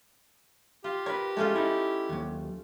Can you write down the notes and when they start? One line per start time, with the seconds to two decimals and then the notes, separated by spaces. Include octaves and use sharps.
0.84 F4 G4
1.06 A#4 B4 C#5
1.37 G#3 A3 C#4 F4
1.55 D#4 E4
2.09 D#2 F#3